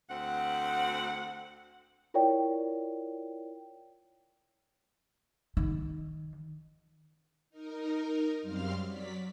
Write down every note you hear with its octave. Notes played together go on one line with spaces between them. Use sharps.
D2 C4 F#5
E4 F4 A#4 C#5 D5 G5
D#3
D#4 A#4
F#2 G3 C4 F5 C6 F6
F#3 D5 B6